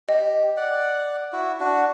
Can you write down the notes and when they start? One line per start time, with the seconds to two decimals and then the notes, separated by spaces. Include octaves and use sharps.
0.09 G4 D#5
0.57 D5 F#5
1.33 E4 F#4
1.60 D4 F#4